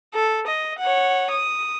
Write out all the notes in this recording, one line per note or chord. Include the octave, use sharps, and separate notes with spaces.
A4
D#5
C#5 F#5
D#6